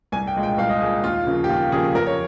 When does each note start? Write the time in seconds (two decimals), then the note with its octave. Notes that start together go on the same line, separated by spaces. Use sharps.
0.12 C2 G#5
0.27 G5
0.35 A#2 G#3
0.43 G5
0.58 C2 F5
0.69 D#5
0.81 A#2 G#3 G#4
1.04 D#2 F4
1.27 C#3 F3 A#3
1.44 G4
1.49 D#2 F4
1.72 C#3 F3 A#3 G#4
1.95 F2 A#4
2.07 C#5